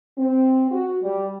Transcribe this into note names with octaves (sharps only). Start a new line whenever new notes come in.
C4
F#4
G3